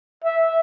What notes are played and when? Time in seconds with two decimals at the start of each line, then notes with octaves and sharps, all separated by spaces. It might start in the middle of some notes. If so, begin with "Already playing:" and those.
0.24 E5